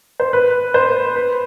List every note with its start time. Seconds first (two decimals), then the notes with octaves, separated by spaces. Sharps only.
0.20 C5
0.33 B4
0.74 C5
1.16 B4